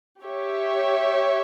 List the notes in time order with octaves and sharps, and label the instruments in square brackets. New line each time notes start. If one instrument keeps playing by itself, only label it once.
[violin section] G4 C#5 E5